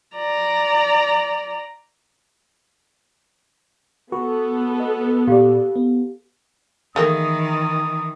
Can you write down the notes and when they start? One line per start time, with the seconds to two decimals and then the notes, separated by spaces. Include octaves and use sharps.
0.16 D5 A#5
4.12 B3 F#4 A4 B4
4.80 D#5
5.27 A#2 G4 D5 F5
5.76 B3
6.96 D#3 E3 A3 A#3 G#4 D#6